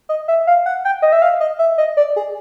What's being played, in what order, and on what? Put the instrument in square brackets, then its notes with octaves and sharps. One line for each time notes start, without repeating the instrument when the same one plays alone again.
[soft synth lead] D#5
E5
F5
F#5
G5
D#5
E5
F5
D#5
E5
D#5
D5
G#4